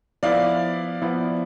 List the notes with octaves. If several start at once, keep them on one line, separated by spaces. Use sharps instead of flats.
F3 B3 E4 D5 F5
F3 B3 E4